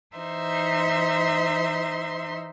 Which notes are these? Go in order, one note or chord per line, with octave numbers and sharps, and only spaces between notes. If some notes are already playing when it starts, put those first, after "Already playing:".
E3 D#4 C5 E5 C6